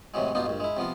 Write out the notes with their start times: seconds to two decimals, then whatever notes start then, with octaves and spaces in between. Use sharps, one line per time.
0.14 A2 C3 E3 F#3 G#3
0.35 G2 B2 B3 D4 D#4 F4
0.46 A#1 G2
0.60 G#3 E4
0.77 C3 F3 B3 F4